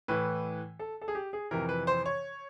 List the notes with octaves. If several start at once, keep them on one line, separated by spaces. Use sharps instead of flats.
A2 E3 B4
A4
A4
G#4
G4
G#4
F2 C3 E3 A#4
B4
C5
C#5